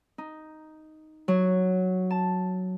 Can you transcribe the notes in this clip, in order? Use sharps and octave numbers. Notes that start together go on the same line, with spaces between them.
D#4
F#3
A5